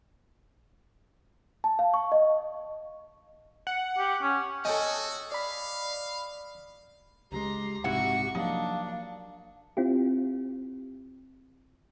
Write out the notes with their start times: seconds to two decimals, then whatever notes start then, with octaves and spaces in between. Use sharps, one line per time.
1.64 A5
1.79 F5
1.94 C#6
2.12 D#5
3.67 F#5
3.98 G4
4.22 C#4
4.65 F#4 A4 C#5 D#5 G5 G#5
5.32 D5 F5 B5
7.32 C#2 F#3 G#3 G4 A#5 C6
7.84 A#1 G#2 C3 E4 F#4 F#5 C#6
8.35 F3 F#3 A#3 D4 D#4 F5
9.77 C4 E4 F4 G4